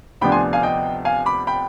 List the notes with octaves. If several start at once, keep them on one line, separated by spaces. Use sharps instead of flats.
D2 C3 F3 B3 D4 G5 B5
G#5 C6
F5 G#5
D#5 G5
F5 G#5
B5 D6
G5 B5